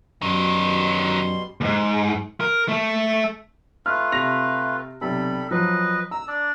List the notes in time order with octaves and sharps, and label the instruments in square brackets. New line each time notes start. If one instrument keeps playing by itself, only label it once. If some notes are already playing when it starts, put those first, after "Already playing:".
[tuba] F#2 [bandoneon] B2 G3 C6 [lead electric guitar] D#3 F#3
[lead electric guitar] D#2 G#2
A#4
A3 A4
[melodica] A3 F4 B4 [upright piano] F6
[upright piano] C3 A#6 F7
[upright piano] B1 C3 [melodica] G3 A4 B5
[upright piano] F3 F#3 [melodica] B4 D#5
[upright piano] A#5 [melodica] E6
[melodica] D4 D5